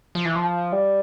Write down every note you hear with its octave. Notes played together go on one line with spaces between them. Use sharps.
F3
E3
F3
G3